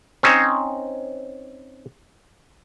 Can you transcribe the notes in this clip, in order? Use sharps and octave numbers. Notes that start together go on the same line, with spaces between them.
C4 C#4 D#4 C5 C#5